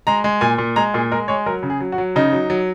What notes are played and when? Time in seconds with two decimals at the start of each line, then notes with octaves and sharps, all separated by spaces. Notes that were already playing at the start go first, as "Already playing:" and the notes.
0.07 G#3 A#5
0.24 G#3
0.41 A#2 G#5
0.58 A#2
0.76 G#3 A#5
0.94 A#2 G#4
1.11 G#3 A#4
1.28 G#3 C#5
1.46 F#3 A#4
1.63 C#3
1.70 G#4
1.80 F#3
1.92 F#4
1.98 F#3
2.16 C#3 D#4
2.32 F#3
2.50 F#3